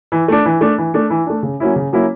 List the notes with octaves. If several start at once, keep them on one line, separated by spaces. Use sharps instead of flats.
E3
A3 D4
E3
A3 D4
E3
A3 D4
E3
A3 D4
C#3
F#3 A#3 C#4 E4
C#3
F#3 A#3 C#4 E4